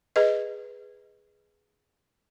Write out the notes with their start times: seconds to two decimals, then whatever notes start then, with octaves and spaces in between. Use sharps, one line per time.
0.16 G#4 B4 D#5